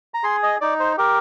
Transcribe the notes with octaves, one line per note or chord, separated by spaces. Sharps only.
A#5
G#4 C6
D#5
D#4 D5
C5
G4 A#4